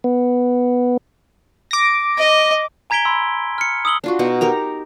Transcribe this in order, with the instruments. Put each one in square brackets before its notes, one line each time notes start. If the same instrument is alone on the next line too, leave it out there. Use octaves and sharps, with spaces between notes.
[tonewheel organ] B3
[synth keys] D6 A#6
[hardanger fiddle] D#5
[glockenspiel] G#5 A#5 G#6 B6 D7 G7
B5 C6 E6
F6 C#7
D#6 E6 F#7 G7
[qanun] D4 F4 F#4
B2 D#4 F#5
D#4 G4 A#4 A#5